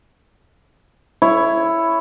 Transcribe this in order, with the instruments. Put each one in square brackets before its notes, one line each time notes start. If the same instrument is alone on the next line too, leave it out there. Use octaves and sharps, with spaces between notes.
[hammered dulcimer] E4 C#5